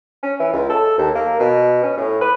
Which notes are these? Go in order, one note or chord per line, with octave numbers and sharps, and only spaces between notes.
C#4
E3
C#2
A4
D#2
A#3
B2
C#4
A2
B4